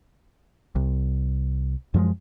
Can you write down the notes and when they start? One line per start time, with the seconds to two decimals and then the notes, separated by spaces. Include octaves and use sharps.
0.76 C2
1.94 F#2 F3 G3 G#3